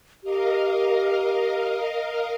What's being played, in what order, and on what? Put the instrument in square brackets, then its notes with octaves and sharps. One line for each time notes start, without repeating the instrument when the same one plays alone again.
[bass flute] G4 [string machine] A#4 D#5 F5